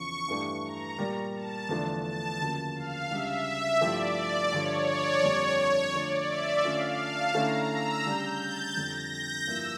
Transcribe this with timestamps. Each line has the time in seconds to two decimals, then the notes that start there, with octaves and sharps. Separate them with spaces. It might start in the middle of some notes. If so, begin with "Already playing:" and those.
Already playing: E2 C#3 F3 C#6
0.28 G2 E3 A3 D4 G4
0.64 A#5
0.99 A#2 G3 A#3
1.34 A5
1.69 E2 D3 F3 A3 D4
2.04 A5
2.39 D2 C#3 F3 A#3
2.75 F5
3.10 C#2 C#3 G3 D4 E5
3.81 G2 F3 A3 E4 G4 D5
4.52 G2 D3 F3 C#5
4.88 D5
5.23 F2 D3 G3 A#3 D4 C#5
5.94 D3 F3 A3 D4 D5
6.28 E5
6.64 D3 A3 C#4 F4 F5
7.00 A5
7.34 D3 A3 C#4 E4 A#5
7.70 E6
8.06 C#3 G3 D4 G6
8.41 A6
8.76 F2 D3 G3 A#6
9.12 G6
9.47 G2 F3 A#3 E4 E6